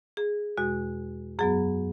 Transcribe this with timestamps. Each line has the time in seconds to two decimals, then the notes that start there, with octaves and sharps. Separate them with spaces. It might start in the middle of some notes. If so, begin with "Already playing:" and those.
0.17 G#4
0.57 E2 B2 G#3 F#4
1.39 F#2 F#3 B3 G#4